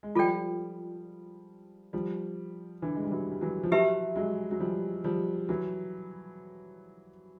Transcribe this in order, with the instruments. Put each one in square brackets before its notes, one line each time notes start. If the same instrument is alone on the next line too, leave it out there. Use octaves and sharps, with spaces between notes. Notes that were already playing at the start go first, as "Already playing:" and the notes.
[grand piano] G#3
[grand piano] F3 G3 [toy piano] F4 A4 D5 G5
[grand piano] F3 G3
D3 E3
G#3
G3
E3 F#3
G3
E3 F#3
F3
[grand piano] E3 F#3 [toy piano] G4 B4 E5 A5 C6
[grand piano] F#3 G#3
F#3
F3 G3
F3 G3
E3 F#3